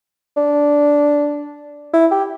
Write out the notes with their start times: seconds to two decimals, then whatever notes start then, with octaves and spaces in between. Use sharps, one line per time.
0.37 D4
1.94 E4
2.11 G4